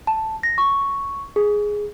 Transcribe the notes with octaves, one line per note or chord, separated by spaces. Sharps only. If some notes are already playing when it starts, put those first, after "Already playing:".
A5
A#6
C#6
G#4